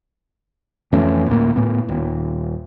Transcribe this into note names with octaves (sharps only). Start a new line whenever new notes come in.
F2 E3 A3 C#4
D2 A2 A#3
A2 B3
D#1